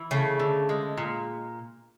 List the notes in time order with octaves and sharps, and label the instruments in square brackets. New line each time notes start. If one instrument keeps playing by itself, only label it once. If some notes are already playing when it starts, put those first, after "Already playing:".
Already playing: [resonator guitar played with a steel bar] E3
[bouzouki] C#3 [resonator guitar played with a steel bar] A3
[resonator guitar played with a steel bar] D3
G#3
A#2